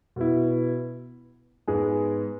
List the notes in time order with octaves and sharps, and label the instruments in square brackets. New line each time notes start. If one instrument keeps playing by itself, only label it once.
[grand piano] B2 B3 E4
G#2 G#3 B3 G#4